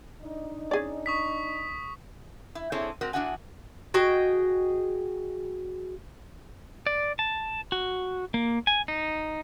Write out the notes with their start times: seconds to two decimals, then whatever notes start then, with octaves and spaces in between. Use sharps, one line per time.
0.22 D4 D#4
0.71 C#4 G#4 D5
1.06 C#6 D#6 B6
2.55 E4
2.72 C4 D4 E4 G#4 A4 C#5
3.01 G#3 C4 F#4 A#4
3.13 E2 D4 E4 F#4 F#5 G#5
3.94 F#4 G#4 D#5 G5
6.87 D5
7.19 A5
7.72 F#4
8.34 A#3
8.67 G#5
8.88 D#4